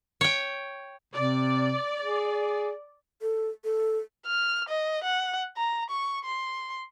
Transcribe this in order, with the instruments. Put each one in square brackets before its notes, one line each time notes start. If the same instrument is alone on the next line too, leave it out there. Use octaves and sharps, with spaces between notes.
[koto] C#5 G5
[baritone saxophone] C3 [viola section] D5
[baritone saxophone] G#4
[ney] A4
A4
[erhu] F6
D#5
F#5
A#5
C#6
C6